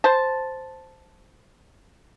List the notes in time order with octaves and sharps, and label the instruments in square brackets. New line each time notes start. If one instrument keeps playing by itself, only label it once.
[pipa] C5 A5